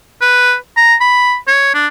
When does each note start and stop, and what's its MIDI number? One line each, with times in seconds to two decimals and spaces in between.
0.21 0.55 71
0.77 0.95 82
1.01 1.36 83
1.48 1.70 73
1.74 1.87 62